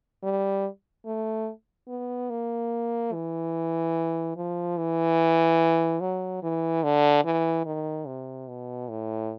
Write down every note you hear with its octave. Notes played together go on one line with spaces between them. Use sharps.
G3
A3
B3
A#3
E3
F3
E3
F#3
E3
D3
E3
D#3
C3
B2
A2